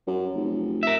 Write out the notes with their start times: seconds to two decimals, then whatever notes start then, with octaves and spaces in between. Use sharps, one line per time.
0.07 F#2
0.34 F1
0.83 A#4 E5